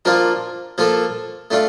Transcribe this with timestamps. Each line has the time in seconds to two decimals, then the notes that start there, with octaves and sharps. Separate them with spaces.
0.05 F3 A#3 D4 F4 A#4
0.78 F3 A#3 F4 A4
1.51 A3 D4 F4